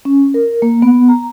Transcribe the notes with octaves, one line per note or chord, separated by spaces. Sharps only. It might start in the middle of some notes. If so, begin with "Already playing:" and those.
C#4
A#4
A#3
B3
A#5